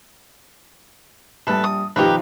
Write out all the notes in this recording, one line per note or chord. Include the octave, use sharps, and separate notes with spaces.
A#1 G3 A4 B4 A5
D#6
B1 D#3 F3 G4 A#4 B4